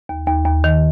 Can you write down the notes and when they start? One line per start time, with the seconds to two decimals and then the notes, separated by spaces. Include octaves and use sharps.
0.09 D#2
0.27 D#2
0.45 D#2
0.64 D#3